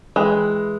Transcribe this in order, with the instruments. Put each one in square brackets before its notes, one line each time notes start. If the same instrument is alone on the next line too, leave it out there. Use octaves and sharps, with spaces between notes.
[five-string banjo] E3 G#3